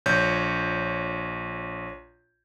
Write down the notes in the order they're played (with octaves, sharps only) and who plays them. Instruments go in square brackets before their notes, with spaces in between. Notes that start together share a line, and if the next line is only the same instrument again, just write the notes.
[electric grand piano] A#1 C#5 G6